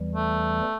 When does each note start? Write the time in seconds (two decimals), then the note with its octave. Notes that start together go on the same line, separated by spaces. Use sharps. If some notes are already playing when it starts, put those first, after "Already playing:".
Already playing: E2 E3 G3
0.15 A3